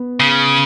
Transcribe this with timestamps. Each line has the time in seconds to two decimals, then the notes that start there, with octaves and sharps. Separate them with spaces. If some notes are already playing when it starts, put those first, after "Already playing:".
Already playing: B3
0.20 C#3